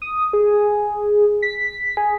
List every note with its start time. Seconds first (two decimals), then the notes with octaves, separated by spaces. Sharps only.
0.02 D#6
0.33 G#4
1.42 B6
1.97 G#4